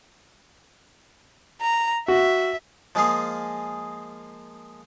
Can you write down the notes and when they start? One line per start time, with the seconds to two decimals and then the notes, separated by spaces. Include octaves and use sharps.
1.62 A#5
2.08 F#4 E5
2.95 F3 G#3 A#3 G#4 F5